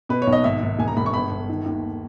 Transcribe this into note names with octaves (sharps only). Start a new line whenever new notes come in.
B2 B4
C#5
B1
D#5
G#1 E5
G#1
E1 G#5
A#5
E1 B5
C#6
G1 B5
G1
D#3
D#2